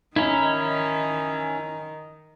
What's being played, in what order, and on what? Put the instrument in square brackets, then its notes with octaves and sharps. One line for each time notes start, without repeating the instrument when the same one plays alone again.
[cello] D#3 [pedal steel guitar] C#4 E4 [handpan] D#4